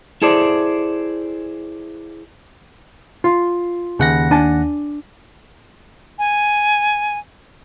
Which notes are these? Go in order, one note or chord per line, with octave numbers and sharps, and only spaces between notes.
E4 G#4 A4 C5 D5
F4
D#2 C#3 F#5 A#6
D4 G#5 A5
G#5